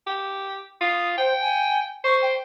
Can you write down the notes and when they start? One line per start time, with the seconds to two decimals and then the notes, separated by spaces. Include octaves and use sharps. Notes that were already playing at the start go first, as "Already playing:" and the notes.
0.07 G4
0.81 F4 D#6
1.18 C5 G5
1.40 G#5
2.04 C5 C#6
2.22 G5